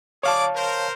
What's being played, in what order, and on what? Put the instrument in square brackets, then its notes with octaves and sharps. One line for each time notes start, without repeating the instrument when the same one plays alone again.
[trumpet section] G#4 D5 D6 [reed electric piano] C#5 F5 A5
[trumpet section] A#4 C5